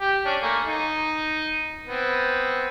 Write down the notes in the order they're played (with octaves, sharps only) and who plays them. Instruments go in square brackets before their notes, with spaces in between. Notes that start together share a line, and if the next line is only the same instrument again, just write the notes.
[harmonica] G4
C#4 D4
A3 A#3 G#5
D#4
B3 C4